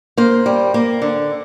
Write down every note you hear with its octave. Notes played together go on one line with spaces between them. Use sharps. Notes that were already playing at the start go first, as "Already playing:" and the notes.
A#3 C5
G3
A#3
D3